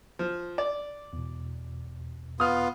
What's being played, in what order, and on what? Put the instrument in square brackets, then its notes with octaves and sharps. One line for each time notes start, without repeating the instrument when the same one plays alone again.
[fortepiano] F3
D5
[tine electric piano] E2 B2
[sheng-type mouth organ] B3 F4 [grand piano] D#6 F6